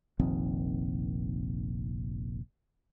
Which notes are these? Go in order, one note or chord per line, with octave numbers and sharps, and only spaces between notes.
F1 A#1 D#3 C4